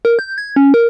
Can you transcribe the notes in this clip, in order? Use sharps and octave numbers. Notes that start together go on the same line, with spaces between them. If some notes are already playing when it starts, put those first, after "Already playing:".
A#4
G6
G#6
C#4
A#4